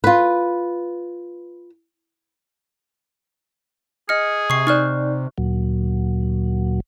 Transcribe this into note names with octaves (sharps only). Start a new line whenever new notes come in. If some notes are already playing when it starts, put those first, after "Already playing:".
F4 B4
G#4 D#5 F6 C#7
C3 C#6 C7
D#4 D5 C#6 F6 F#6
D2 A#2 F#3